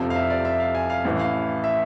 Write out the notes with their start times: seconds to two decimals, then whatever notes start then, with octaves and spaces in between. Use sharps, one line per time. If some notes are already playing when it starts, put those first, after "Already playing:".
Already playing: F1 F2 C3 F3
0.10 F5
0.16 E5
0.30 D5
0.45 E5
0.60 F5
0.75 G#5
0.90 F5
1.04 A1 A2 E3
1.20 F5
1.64 E5